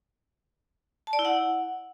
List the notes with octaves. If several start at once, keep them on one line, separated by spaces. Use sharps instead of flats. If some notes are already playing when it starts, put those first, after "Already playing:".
A5
D5
E4
F#5